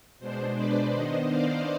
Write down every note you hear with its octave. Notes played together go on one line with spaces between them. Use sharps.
B2 G#3 D4 C5
B4 D5
D#3 B3 D4 C5 D#5
D5 F5